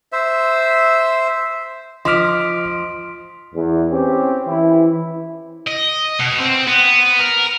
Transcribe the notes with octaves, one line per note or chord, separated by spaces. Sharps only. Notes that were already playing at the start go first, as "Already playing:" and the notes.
C5 E5
F3 D#5 C6 D6 F6 B6 D7
E2
C4 C#4 G4
E3 E4
D#5
B2
C4
B3
A#4